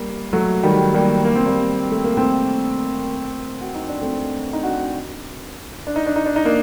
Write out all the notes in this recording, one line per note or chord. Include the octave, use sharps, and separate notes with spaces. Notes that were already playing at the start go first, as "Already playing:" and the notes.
Already playing: G3 A#3
F#3 A3
D#3 G3
G3 A#3
A#3
C4
G3 A#3
A3
A#3
A3 C4
F#4
D#4
D4
A3 C4
D#4
D4 F#4
D4
D#4
D4
D#4
D4
D#4
A#3 D4